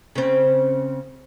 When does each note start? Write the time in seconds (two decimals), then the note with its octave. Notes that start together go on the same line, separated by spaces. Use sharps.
0.15 C#3 C4